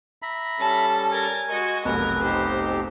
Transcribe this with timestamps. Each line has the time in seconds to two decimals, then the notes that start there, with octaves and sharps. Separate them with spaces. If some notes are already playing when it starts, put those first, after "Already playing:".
0.22 E5 A#5 B5
0.60 G3 C#4 A4 A5
1.11 A#4 G#5 A6
1.48 G#3 F#4 D#5 C#6
1.85 F1 B1 A#4 B4
2.23 D#4 G4 C5